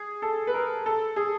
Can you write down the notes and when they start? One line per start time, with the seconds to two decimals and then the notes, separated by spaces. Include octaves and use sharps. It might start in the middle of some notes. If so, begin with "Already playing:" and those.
Already playing: G#4
0.22 A4
0.47 B4
0.54 A#4
0.86 A4
1.16 G#4